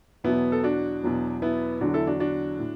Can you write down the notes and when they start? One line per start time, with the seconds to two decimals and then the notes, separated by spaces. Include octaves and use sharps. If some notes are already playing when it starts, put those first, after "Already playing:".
0.24 E2 B2 F#3 B3 E4
0.52 A4
0.63 D4 F#4
1.03 E2 B2 F#3
1.42 B3 E4
1.81 E2 D3 F#3 D4 F#4
1.94 E4 A4
2.07 D4 F#4
2.20 D4 F#4
2.59 A2